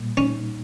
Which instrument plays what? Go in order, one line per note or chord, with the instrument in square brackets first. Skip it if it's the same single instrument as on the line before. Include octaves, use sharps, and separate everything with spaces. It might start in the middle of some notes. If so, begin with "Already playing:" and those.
Already playing: [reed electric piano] A#2 G3 A#3
[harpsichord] C#4 [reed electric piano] D#4